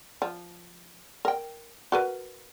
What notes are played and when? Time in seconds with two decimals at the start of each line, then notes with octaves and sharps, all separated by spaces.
0.22 F3
1.25 A#4 G5
1.92 F#4 A#4 B4